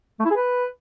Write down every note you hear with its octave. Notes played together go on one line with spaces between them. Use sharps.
A3
E4
G#4
B4